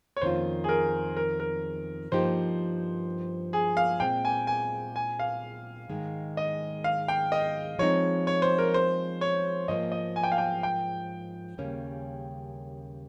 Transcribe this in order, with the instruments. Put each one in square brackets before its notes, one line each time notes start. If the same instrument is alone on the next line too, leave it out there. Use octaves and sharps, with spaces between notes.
[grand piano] C#5
[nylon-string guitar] F2 D#3 A#3 C#4 F4 [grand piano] C5
[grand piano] G#4
A#4
A#4
A#4
[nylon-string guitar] G2 F3 A#3 D#4 G4 [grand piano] C5
[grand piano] G#4
F5
[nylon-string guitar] A#2 G#3 C4 [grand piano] G5
[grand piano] G#5
G#5
G#5
F5
[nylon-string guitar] G#2 D#3 G#3
[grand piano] D#5
F5
G5
D#5
[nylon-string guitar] F3 G#3 C4 D#4 [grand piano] C#5
[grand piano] C#5
C5
A#4
C5
C#5
[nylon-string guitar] G#2 F3 A#3 [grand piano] D#5
[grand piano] D#5
G#5
G5
F5
G5
G5
[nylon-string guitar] D#2 C#3 G3 A#3 C#4